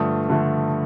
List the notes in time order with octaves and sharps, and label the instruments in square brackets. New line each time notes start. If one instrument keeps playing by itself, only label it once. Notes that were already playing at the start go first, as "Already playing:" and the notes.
Already playing: [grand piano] G2 D3 F3 A3 D#6
D3 F3 A3